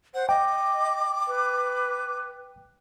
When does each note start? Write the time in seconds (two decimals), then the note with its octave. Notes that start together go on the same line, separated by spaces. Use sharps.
0.14 C5 F#5
0.29 D#5 G5 D6
1.28 B4